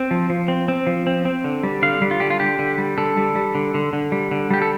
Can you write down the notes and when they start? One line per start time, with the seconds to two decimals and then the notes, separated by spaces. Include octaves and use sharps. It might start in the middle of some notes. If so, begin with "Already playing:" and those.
Already playing: C4
0.11 F3
0.30 F3
0.48 C4
0.68 C4
0.87 F3
1.07 C4
1.25 C4
1.44 D3
1.63 G3
1.82 D3 F5
2.02 G3
2.11 F4
2.20 D3 G4
2.30 F4
2.40 D3 G4
2.59 D3
2.78 G3
2.98 D3 A4
3.17 G3
3.36 G3
3.55 D3
3.74 D3
3.93 D3
4.12 G3
4.31 D3
4.51 G3 G4
4.62 A4